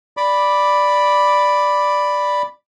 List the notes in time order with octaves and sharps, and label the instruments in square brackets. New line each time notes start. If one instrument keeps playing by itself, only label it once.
[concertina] D5 B5 D6